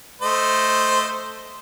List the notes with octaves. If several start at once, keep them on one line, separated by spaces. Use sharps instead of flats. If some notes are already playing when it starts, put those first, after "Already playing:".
A3 C5 D#5